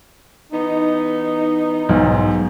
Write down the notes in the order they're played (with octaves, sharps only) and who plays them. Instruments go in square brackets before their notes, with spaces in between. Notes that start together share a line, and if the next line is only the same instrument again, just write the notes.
[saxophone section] E3 B3 D#4
[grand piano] B1 G#2